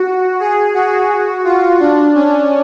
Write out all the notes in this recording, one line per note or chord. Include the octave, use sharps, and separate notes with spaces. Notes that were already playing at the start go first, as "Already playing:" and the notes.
Already playing: F#4
G#4
F#4
F4
D4
C#4